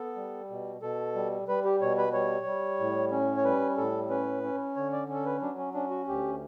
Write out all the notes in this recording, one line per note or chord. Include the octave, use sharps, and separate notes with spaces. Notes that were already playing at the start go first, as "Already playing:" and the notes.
Already playing: B3 A4
G3
B2
B2 A4
G3
G3 B4
G4
B2 C#5
B4
G3 C#5
G3
A2
C#4
C#5
G3 B4
A2 A4
C#4 B4
C#4
D3 C#5
D5
C#4 A4
B4
F#3 D4
C#4
C#4 D4
F#4
D2 G4